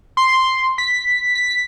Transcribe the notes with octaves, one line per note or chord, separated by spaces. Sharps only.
C6
B6
B6